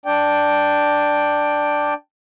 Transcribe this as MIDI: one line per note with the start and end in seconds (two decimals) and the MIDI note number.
0.06 1.94 62
0.06 1.94 74
0.06 1.94 79